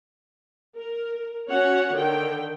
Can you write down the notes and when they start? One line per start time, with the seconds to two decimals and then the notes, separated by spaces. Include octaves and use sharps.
0.76 A#4
1.49 C#4 F#4 C#5 F#5
1.93 D3 D#3 G5